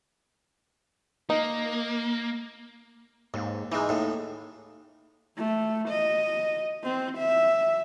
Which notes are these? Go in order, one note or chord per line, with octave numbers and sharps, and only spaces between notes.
A#3 D#4
D#2 G#2
E3 G#3 D#4
D#2 A2 D#3
A3
D#5
C4
E5